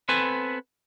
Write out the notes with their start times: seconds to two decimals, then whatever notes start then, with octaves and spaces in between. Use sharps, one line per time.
0.09 B3 C4 A4 B4 G#5